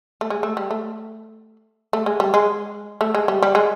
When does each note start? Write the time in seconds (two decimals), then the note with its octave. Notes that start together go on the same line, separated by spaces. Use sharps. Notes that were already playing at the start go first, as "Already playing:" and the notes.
0.21 A3
0.30 G#3
0.43 A3
0.57 G3
0.71 A3
1.93 A3
2.06 G#3
2.20 G3
2.34 G#3
3.01 A3
3.15 G#3
3.28 G3
3.43 G3
3.55 G#3